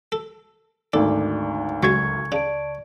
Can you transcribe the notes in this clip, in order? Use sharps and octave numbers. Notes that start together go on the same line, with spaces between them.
A4
G#1 D2 D#4 A4 D5
C#2 F#3 G#3 C#6 G#6
C#3 D5 A5 D7